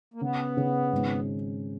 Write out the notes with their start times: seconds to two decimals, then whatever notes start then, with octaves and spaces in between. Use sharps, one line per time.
0.14 A#3
0.21 C#3 B3
0.57 C#3
0.92 G#1